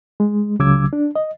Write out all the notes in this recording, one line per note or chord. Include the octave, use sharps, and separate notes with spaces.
G#3
C#2 C#3 F#3 D6 E6 G#6
D4
D#5